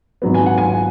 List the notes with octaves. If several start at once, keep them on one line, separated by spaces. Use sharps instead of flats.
G#1 G#2 F#3 B3
G#5
F#5
G#5